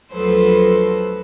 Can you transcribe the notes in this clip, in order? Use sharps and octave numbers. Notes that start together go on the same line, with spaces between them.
D2 F3 F#3 A4 B4 C5